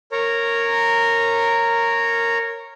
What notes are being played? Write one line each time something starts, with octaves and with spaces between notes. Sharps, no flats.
A#4 C#5 A#5